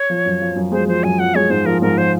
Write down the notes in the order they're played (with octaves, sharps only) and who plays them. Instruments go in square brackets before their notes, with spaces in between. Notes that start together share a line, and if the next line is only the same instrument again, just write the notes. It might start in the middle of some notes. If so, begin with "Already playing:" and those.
Already playing: [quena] C#5
[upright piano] F3
F#2
F3
F#2
[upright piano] G#3 [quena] C5
[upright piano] F3 [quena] C5
[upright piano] F#2 [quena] G#5
[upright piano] F3 [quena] F#5
[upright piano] G#3 [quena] C#5
[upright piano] G#2 [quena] C5
[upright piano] F3 [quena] A#4
[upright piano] G#2 [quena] A#4
[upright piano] F3 [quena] C5